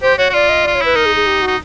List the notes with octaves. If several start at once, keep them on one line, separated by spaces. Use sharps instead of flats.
G4 C5
F#4 C#5
F#4
F4 D5
D#5
F4 D5
C#5
E4 B4
D#4 A#4
G#4
G#4
G4
F#4
D#4